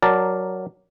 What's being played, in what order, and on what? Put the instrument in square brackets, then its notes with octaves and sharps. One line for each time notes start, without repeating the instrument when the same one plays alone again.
[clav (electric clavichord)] F#3 A#4 D5 A5